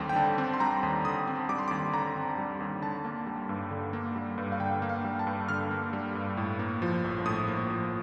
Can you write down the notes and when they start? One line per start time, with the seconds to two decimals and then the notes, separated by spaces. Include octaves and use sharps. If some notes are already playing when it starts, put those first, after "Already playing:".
Already playing: D#2 D3 G3 C4
0.09 G5
0.16 D3 A5
0.38 C4
0.54 C6
0.60 G3 A#5
0.83 D#2
1.05 D3 D#6
1.27 C4
1.49 G3 D6
1.58 C6
1.68 D#2 D6
1.93 D3 A#5
2.16 C4
2.38 G3
2.60 D#2
2.82 D3 A5
3.05 A#3
3.27 G3
3.49 G2
3.71 D3
3.93 A#3
4.15 G3
4.38 G2
4.52 F5
4.60 D3 G5
4.82 A#3
4.89 F5
5.04 G3
5.19 A5
5.27 G2
5.48 D3 F6
5.71 A#3
5.93 G3
6.15 G2
6.37 A2
6.59 A#3
6.82 F3
7.04 A#1
7.26 A2 D#6
7.48 A#3
7.70 F3